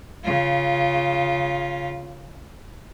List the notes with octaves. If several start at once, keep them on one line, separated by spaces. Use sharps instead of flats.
C#3 F4